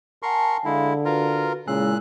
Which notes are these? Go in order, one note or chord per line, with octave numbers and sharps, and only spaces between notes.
A#4 F#5 G#5 A5 C6 C#6
D3 G#3 E4 F5
F4 F#4 A#4 B4
A#2 C#3 G#3 E4 E6 F#6